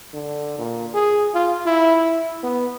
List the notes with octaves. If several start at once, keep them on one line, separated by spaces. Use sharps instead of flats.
D3
A#2
G#4
F4
E4
B3